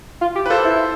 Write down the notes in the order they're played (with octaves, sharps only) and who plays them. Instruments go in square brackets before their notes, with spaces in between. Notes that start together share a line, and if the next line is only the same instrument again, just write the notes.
[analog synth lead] F4
G4
[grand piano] B4
[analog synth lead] F4 [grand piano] A4 C5
[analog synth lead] E4